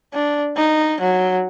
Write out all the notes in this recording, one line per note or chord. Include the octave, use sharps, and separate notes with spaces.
D4
D#4
F#3